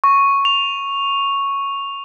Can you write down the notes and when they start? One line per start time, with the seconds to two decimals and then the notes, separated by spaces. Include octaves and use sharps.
0.04 C#6
0.45 F7